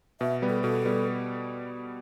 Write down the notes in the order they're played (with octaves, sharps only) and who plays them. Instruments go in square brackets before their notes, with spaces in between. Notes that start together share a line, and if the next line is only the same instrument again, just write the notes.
[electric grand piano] B2 [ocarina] E5
[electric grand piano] G3 B3
[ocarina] A4
[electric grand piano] B2 [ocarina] A4
[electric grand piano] G3 B3